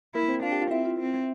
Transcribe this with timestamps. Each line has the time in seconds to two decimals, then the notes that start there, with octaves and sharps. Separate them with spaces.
0.15 A#3 E4 A#4
0.28 C4 C5
0.43 D4 F4 F5
0.52 G4 G5
0.61 F4 F5
0.71 C4 E4 E5
0.85 F4
0.99 C4